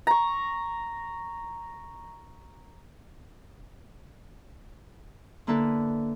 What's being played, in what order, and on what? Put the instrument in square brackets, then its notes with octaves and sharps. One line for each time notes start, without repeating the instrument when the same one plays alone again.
[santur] A#5 C#6
[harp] D3 A#3 E4 A4 B4